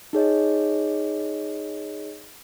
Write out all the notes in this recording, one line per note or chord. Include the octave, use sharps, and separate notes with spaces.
D#4 G#4 C#5 D#5